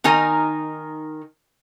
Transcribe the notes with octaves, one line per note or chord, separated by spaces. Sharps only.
D#3 D#4 A#4 G#5